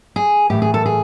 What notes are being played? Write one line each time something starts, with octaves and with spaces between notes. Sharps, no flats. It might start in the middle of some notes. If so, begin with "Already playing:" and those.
G#4
A2 E3 G4
G#4
A4
G#4